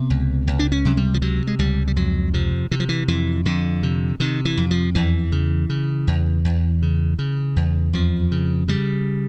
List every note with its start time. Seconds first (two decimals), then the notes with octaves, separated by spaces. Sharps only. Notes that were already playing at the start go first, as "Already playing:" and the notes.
Already playing: C3 B3
0.10 C#2
0.47 C#2
0.59 D4
0.72 C#4
0.85 C3 F#3
0.97 G3
1.14 F3
1.22 C3 F#3
1.47 G#3
1.59 C#2 G3
1.87 G3
1.96 F2 F#3
2.33 C3 F3
2.71 C3 E3
2.80 F3
2.89 E3
3.08 F2 E3
3.45 F2 D3
3.83 C3
4.20 C3 D#3
4.45 E3
4.57 F2
4.71 F3
4.95 E2 E3
5.32 C#3
5.70 C#3
6.07 E2
6.45 E2
6.82 C#3
7.19 C#3
7.56 E2
7.93 F2 F3
8.32 C#3
8.68 C#3 G3